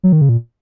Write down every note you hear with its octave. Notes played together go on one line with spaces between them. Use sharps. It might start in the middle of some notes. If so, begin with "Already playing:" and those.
F#3
D#3
C#3
A#2